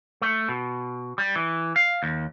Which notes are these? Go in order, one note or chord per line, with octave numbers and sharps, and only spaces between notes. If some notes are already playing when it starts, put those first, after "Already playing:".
A3
B2
G3
E3
F5
D#2